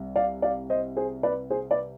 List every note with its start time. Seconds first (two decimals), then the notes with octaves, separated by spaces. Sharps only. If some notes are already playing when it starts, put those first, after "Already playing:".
Already playing: C2 C3 G3
0.16 D5 F5
0.42 D5 F5
0.70 C5 D#5
0.97 G#4 C5
1.23 B4 D5
1.50 G#4 C5
1.71 B4 D5